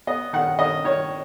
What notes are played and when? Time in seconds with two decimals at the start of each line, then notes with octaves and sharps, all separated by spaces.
0.07 B3 D#5
0.33 D#3 F#5
0.59 D#3 D#5
0.84 D#3 C#5